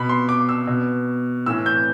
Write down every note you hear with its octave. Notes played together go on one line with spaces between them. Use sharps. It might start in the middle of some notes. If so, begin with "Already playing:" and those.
Already playing: B2 B5
C6
D6
E6
B2
A2 E3 E6
G6